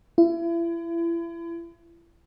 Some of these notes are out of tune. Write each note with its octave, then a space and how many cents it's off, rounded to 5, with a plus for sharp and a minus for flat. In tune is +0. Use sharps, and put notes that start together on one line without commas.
E4 +35